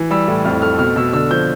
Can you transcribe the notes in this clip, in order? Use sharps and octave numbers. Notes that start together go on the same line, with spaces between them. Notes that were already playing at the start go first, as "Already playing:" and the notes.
Already playing: E3
G3 E6
A2
F2 F6
A3 F6
B2 F6
B2 E6
D3 E6
F3 G6